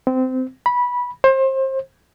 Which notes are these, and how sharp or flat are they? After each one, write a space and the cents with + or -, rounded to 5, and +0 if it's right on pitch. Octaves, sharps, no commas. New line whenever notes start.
C4 -20
B5 -15
C5 +30